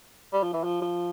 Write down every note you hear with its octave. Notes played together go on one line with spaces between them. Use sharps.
G3
F3
E3
F3
F3